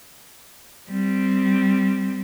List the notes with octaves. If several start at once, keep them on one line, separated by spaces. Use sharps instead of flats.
G3 C4